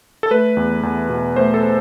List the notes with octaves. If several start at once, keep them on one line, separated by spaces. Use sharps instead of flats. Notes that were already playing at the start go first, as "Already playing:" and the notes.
A4
A3 B4
E2
E2
B2
A3 C5
A4